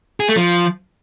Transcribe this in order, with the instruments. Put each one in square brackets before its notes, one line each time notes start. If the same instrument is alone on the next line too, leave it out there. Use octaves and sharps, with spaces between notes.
[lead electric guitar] G#4
A3
F3